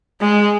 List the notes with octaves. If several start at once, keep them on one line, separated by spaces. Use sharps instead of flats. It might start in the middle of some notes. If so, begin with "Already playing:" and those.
G#3